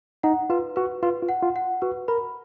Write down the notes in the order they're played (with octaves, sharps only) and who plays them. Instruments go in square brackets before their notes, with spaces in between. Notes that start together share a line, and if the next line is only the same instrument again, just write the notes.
[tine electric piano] D#4 [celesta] F#5
[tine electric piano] F4 [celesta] B4
[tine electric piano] F#4 [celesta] B4
[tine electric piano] F4 [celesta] B4
[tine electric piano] F4
[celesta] F#5
[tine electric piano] F4
[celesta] F#5
[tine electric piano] F#4 [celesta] B4
[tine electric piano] A#4 [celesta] B5